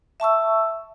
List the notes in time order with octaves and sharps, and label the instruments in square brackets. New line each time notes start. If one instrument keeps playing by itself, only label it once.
[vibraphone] E5 A5 C#6 E6